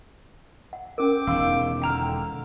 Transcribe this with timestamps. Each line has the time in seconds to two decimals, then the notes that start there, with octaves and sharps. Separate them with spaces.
0.73 F#5
0.98 C#4 A#4 G5 D6
1.27 E1 D#3 F5 E6
1.82 D3 G5 A#5 F6